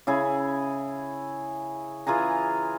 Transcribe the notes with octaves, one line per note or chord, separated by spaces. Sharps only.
C#3 E4 G#4
E3 F4 G#4 A#5